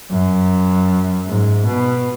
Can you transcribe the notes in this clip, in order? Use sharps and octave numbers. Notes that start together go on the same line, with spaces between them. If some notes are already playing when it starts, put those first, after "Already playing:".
F#2
G#2
B2